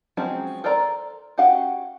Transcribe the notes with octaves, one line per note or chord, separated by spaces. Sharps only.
F3 F#3 G#3 C4 C#4
A4 A#4 C5 D5 A#5
C#4 F#4 G4 F5 F#5